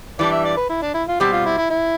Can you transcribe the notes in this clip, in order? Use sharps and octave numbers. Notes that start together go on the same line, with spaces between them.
E3 G3 D4 D5
E5
D5
B4
E4
D4
E4
F4
B2 G3 C4 G4
F4
E4
E4
E4